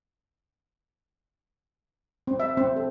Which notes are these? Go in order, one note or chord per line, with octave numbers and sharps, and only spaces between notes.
C4
E5
C4
A4